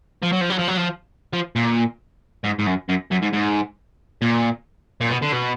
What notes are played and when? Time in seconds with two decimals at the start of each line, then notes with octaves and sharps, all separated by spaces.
0.22 F3
0.32 F#3
0.41 F3
0.50 F#3
0.58 F3
0.68 F#3
0.77 F3
1.33 F3
1.56 A#2
2.44 G#2
2.59 G#2
2.67 F#2
2.89 F#2
3.11 F#2
3.22 G#2
3.33 G#2
4.22 A#2
5.01 A#2
5.10 B2
5.22 D3
5.32 B2